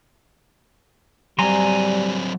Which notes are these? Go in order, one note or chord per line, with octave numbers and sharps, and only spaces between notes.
F#3 G3 C4 G#5 A#5 C6